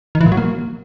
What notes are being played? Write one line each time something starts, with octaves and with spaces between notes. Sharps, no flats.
D#3
E3
A#2
F#3
A#3